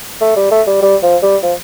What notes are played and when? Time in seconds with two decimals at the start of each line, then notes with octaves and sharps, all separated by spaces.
0.21 A3
0.36 G3
0.51 A3
0.67 G3
0.82 G3
1.03 F3
1.23 G3
1.43 F3